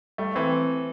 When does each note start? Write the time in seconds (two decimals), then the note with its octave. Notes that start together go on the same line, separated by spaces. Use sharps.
0.18 G3 A3
0.35 E3 C4